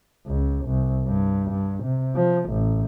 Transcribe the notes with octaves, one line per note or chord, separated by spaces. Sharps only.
C#2
C2
G2
G2
C3
F3
A1